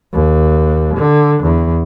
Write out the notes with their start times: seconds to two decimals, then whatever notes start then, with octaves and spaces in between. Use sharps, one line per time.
0.13 D#2
0.96 D3
1.43 E2